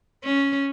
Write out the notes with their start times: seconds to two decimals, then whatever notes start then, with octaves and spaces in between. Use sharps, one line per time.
0.24 C#4